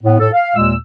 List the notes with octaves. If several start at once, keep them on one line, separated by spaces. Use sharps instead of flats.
A2 B3
A2 A4
F5
D#2 A#2 G#3 E6